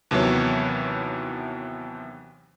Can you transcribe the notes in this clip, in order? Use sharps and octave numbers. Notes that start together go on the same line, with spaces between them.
D#2 C3 E3 F#3 B3 C#5